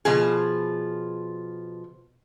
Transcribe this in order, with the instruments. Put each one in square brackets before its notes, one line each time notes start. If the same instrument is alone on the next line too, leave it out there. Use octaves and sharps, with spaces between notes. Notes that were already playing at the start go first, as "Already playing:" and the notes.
[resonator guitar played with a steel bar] B2 F3 G#4